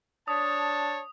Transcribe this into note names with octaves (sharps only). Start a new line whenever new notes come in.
D4 C#5 A5 D#6